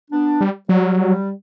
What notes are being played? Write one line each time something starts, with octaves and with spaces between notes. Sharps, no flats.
B3 D4
G3
F#3 G3
G3